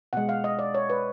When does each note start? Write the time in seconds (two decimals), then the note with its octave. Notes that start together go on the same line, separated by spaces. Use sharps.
0.13 B2 G#3 F#5
0.29 F5
0.44 D#5
0.59 D5
0.74 C#5
0.90 B4